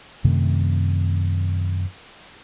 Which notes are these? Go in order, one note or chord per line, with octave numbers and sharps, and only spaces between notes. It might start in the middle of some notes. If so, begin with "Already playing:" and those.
F#2 C3 D#3 A3